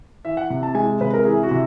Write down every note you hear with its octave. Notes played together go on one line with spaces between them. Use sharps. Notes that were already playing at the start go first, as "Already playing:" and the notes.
E3 E5
F#5
C3
A5
G#3 G#5
C3 B4
A#4
E3 G#4
F#4
C3